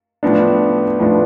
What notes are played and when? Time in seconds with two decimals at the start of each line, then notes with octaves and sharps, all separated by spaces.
0.23 A2 F3 B3 D4
0.99 A2 F3 B3 D4